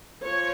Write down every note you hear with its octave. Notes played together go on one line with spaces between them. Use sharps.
F3 C#5